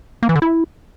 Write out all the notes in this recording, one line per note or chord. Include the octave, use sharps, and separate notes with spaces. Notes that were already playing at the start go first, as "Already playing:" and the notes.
A#3
E3
D3
E4